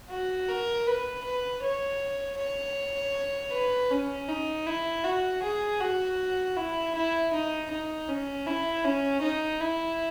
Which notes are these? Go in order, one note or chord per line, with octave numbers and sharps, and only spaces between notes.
F#4
A#4
B4
B4
C#5
C#5
B4
C#4
D#4
E4
F#4
G#4
F#4
E4
E4
D#4
D#4
C#4
E4
C#4
D#4
E4